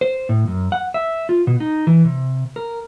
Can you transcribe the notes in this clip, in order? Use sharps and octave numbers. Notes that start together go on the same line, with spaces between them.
C5
A2
F#2
F#5
E5
F4
B2
D#4
E3
C3
A#4